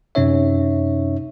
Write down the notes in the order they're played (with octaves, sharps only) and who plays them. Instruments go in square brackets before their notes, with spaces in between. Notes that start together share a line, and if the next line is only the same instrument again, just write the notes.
[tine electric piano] F#2 C3 C#4 D#4 C#5 E5